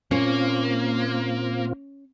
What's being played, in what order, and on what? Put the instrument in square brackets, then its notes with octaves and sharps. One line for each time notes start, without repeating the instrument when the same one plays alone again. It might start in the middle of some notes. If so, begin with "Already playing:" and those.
[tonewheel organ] A#2 C4 F4 [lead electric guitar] A#3 [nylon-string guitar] C#4